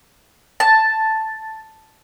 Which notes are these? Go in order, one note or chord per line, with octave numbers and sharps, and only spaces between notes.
A5